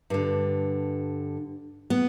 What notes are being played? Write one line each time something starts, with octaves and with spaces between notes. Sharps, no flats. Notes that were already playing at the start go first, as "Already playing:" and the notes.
G2 D3
B3